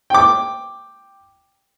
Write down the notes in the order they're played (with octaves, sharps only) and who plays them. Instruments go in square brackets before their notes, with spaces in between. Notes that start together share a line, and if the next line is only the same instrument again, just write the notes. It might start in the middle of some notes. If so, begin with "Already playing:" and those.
[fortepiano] G5 D6